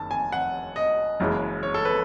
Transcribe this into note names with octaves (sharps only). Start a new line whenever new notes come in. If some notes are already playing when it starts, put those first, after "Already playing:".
Already playing: F#1 F#2 D#3 A5
G#5
F#5
D#5
F#1 F#2 E3 G#3
C#5
A4
B4